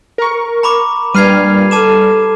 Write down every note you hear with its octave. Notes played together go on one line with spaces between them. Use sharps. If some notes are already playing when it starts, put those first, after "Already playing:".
A#4 C#6
A#5 B5 D6
A#2 G3 D4 B4 F6 G#6 C7 D#7
A4 A5 D6 E7